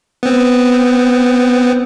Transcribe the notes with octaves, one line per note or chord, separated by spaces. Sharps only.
B3 C4